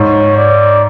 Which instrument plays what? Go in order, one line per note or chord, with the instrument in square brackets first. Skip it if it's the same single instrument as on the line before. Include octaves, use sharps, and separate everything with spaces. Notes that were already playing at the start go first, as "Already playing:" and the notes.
Already playing: [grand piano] G#2 [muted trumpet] C#5
[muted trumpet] D5